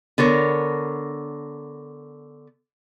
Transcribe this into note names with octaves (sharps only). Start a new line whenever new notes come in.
D3 B3 A#4 C#5